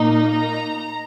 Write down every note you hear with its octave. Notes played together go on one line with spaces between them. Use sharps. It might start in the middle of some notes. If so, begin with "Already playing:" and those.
Already playing: A#2 A#3 D#4
A#5